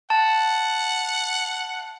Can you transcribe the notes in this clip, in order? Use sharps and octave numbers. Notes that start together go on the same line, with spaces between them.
F#5 A5